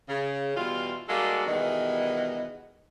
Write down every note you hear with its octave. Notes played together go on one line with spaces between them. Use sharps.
C#3
B2 E3 G3 F4
G3 G#3 A#3 D#4 F#4 A4
B2 D#3 E3 G3 G#3 B3